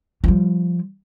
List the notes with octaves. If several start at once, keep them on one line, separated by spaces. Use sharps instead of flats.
F3 G3